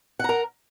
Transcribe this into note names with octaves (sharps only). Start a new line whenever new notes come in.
A#4 F#5 A#5